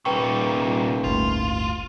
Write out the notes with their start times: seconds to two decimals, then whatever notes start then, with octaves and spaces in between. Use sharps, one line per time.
0.05 D#1 C2 A#2 B4 G5 C#6
1.04 G1 D2 A2 F4